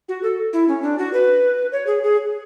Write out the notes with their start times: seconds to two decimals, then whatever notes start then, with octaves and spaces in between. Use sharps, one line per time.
0.09 F#4
0.23 A4
0.53 E4
0.68 C#4
0.82 D4
0.99 F#4
1.13 B4
1.72 C#5
1.87 G#4
2.03 G#4